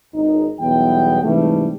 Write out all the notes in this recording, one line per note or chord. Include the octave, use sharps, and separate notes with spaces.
G#1 C#2 D#4
B1 E2 G3 B3 E4 G5
G#2 C3 E3 G3 A3